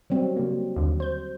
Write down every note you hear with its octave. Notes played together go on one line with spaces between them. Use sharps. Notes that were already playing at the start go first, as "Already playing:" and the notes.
F#3 G3 C4
C#3 A#3
D#2 D3
C5 G6